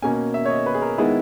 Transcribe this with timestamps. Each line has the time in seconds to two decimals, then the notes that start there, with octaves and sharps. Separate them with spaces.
0.02 B2 A#3 C#4 G#5
0.34 E5
0.45 C#5
0.50 D#5
0.66 B4
0.74 G#4
0.82 A#4
0.98 D#3 G#3 B3 E4 G#4